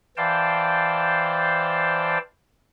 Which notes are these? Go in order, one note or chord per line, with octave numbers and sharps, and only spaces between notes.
E3 C5 D5 F5 G5 A5